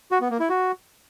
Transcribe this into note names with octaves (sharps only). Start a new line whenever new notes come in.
F#4
B3
A#3
E4
F#4